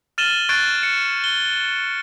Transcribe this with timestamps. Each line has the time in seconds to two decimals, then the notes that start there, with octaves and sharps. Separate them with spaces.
0.18 F6 A6 D#7 E7 F#7 G7
0.49 C#6 F#6 G#6 A6 C7 D7
0.83 C#7
1.24 G7